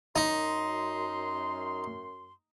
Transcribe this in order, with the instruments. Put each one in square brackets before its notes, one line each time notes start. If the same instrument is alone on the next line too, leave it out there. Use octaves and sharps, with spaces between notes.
[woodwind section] F#2 C6 [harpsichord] D#4